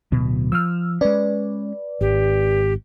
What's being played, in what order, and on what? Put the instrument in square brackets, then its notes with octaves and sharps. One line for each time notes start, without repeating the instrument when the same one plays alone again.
[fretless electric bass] D1 B2
[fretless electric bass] F3 [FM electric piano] E6 F6
[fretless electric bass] G#3 C#4 [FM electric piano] B4 D5
[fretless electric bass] G#1 [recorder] G4